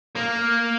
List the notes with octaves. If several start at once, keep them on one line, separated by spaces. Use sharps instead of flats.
A#3